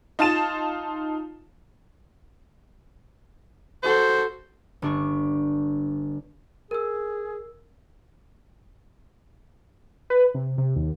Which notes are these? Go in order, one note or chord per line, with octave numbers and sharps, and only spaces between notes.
D#4 F4 A5 A6 E7
F#4 A4 C5
G1 D4 C#6
G#4 A#4 E6
B4
C3
C3
D#2